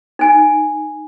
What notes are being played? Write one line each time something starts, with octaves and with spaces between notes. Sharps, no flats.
D#4 G#5